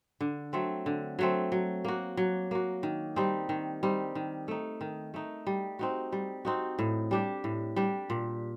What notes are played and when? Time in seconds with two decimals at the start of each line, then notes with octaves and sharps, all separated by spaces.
0.20 D3
0.53 F#3 A3 C4
0.86 D3
1.19 F#3 A3 C4
1.52 F#3
1.85 A#3 F#4
2.17 F#3
2.51 A#3 F#4
2.83 D#3
3.16 G3 C4 D#4
3.49 D#3
3.83 G3 C4 D#4
4.15 D#3
4.48 A3 D#4
4.81 D#3
5.14 A3 D#4
5.47 G3
5.79 C4 D#4 F#4
6.12 G3
6.45 C4 D#4 F#4
6.79 A2
7.11 G3 D4 G4
7.44 A2
7.76 G3 D4 G4
8.10 A#2